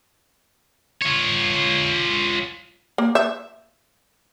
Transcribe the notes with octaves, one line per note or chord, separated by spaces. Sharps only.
F4 C#5
A#3
E5